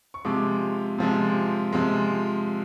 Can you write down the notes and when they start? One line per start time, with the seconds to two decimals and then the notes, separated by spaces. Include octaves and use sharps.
0.14 C#6
0.25 C3 F3 G#3 D6
0.98 C3 F3 G#3
1.73 C3 F3 G#3